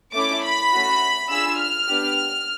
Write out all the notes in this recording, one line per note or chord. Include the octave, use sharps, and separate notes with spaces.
A3 C#4 E4 D6
B5
A3 C#4 F#4
D4 F4 G#4 E6
F6
B3 D4 G4